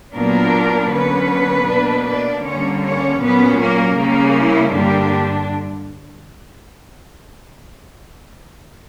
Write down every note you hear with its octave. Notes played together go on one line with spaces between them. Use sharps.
A#2 F#3 A#3 B3 D4 A#4
D3 F#3 A#3 B3 C#4 B4
B2 A#3 D4
D4 D5
D3 G3 A#3 C#4 C#5
C#4 C#5
A#2 F#3 B3 C#4 B4
A#3 A#4
C#3 G3 A#3 C#4
E4
G2 D3 G3 A#3 D4 G4